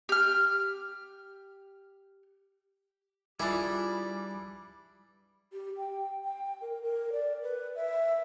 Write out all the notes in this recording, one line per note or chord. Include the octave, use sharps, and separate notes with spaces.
G4 F6
E3 G3 D4 E4 F4 G#4
G4
G5
G5
A#4
A#4
D5
B4
E5